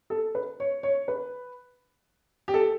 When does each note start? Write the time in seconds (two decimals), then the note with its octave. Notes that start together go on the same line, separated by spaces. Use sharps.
0.10 A4
0.35 B4
0.60 C#5
0.83 C#5
1.08 B4
2.48 G4
2.54 A4